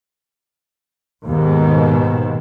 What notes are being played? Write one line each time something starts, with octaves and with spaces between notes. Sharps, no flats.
D#2 G#2 B2 D#3